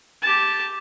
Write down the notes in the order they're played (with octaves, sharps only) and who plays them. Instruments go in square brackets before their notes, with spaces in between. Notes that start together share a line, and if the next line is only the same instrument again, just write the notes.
[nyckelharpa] G4 A5